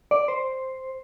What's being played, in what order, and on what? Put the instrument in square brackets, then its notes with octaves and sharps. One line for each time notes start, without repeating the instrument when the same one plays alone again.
[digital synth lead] D5
C5